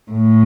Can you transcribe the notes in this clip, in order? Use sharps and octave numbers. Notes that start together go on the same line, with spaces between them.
A2